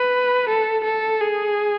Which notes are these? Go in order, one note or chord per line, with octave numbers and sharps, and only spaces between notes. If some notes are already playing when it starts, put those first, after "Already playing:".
Already playing: B4
A4
A4
G#4